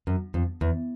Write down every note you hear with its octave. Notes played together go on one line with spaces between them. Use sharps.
F#2
F2
E2